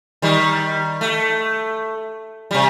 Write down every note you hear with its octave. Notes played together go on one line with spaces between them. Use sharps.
D#3 G3
A3
C3 G3